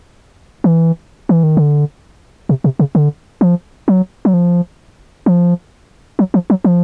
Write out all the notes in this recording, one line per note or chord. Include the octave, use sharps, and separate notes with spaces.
E3
E3
D#3
D3
C3
C3
C#3
D3
F3
F#3
F#3
F3
F3
F#3
F3
F#3
F3